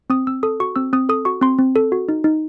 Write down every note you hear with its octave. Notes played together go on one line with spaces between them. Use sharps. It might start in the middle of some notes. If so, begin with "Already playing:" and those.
C4 D#6
C4 E6
A4 D#6
F#4 C#6
C4 E6
C4 D#6
A4 D#6
F#4 C#6
C4 C6
C4
A4
F#4
D#4
D#4